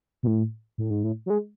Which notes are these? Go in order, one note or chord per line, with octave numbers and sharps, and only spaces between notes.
B2
A2
A2
G#2
A2
F#3
G#3